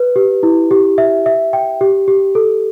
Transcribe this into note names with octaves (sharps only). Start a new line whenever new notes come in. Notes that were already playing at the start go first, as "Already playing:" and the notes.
Already playing: B4
G4
E4
G4
E5
E5
G5
G4
G4
A4